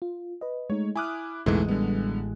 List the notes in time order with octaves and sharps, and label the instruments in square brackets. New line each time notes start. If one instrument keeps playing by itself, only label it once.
[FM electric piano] F4
B4 D#5
[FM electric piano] G#3 A3 D#4 [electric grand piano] C#5
[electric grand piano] E4 D6 F#6 [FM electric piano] G#5 D#6 F6
[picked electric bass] A1 G#3 [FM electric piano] E2 B2 D3 [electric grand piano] G#2 E3 A3
[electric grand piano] D3 B3 [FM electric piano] G3